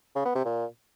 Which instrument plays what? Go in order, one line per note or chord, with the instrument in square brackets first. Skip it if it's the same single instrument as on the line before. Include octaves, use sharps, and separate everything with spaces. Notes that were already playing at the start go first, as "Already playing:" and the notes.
[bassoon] C#3
B3
C3
A#2